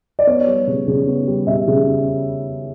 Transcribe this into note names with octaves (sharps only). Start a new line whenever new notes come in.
D5
B3 C#5
G3
C#3
C#3
B3
G3
C#3 E5
C#3